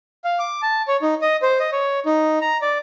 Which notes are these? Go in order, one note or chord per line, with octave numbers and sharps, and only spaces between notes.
F5
D6
A5
C#5
D#4
D#5
C5
D#5
C#5
D#4
A#5
D5